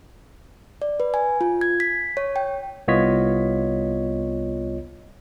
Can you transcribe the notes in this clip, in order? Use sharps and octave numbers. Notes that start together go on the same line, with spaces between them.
D5
B4
G#5
F4
G#6
B6
C#5
G5
C2 B3 F4 C#5 D#5 B6